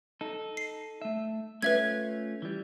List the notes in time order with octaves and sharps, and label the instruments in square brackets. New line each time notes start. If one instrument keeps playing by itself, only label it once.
[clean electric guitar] D#4 A4
[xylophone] C7
[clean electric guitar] A3 E5
[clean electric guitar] A3 C#4 F4 [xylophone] B4 E5 G#6
[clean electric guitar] E3 G3